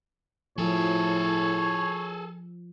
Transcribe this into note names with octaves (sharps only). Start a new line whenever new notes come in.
A2 F3 G#4 A4 C#5